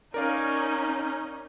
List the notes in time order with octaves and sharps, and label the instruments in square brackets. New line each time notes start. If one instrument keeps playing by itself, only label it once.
[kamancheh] C#4 D#4 [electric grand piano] A#4 D5 F5